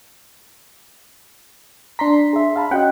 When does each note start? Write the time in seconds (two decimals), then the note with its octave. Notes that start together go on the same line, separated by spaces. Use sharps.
1.99 D4 A#5 C6 B6
2.33 G#4 E5
2.56 F5 A5 B5
2.71 C#4 F#4 D#5 F#5 G5